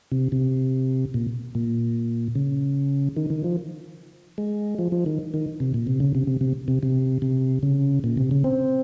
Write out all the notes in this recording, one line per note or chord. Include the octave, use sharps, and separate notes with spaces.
C3
C3
A#2
A#2
C#3
D#3
D#3
F3
G#3
F3
F3
D#3
D#3
C3
A#2
C3
C#3
C3
C3
C3
C3
C3
C3
C#3
A#2
C3
C#3
C4